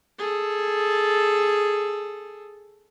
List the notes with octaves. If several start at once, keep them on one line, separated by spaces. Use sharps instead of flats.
G#4 A4